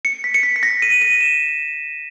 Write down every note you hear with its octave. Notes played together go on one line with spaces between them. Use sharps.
C#7
B6
C#7
B6
B6
A#6
D#7
D#7
E7